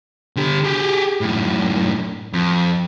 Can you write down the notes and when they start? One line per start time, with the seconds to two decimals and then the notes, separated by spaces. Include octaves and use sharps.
0.36 D3 G4
0.64 G4 G#4
1.21 F#2 A2
2.33 F2